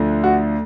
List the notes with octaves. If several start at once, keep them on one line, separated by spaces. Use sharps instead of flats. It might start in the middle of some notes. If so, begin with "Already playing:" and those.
Already playing: D2 D3 F3
F#4